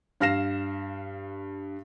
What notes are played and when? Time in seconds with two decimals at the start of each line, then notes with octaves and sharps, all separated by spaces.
0.20 G2 F5 F6 A#6 C7 E7